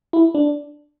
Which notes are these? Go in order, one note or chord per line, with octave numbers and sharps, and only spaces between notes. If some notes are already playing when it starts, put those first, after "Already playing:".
E4
D4